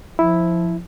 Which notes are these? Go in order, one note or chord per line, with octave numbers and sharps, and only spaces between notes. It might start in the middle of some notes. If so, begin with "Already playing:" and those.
F3 E4